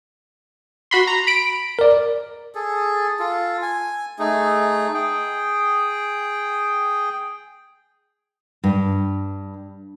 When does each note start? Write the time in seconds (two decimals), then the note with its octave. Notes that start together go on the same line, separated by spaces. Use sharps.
0.91 F#4 B5 C6
1.07 A#5
1.27 B5 D7
1.79 A#4 D5
2.55 G#4 A4
3.19 F4 A4
3.62 G#5
4.19 A3 D#4 G#4
4.94 G#4 G5
8.64 G2